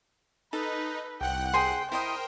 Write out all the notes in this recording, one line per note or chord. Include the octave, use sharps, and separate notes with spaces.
D#4 A4 B4
C2 F#5 G5 F#6
G#4 C5 G5 C6
E4 A#4 C5 D#5 G5 D#6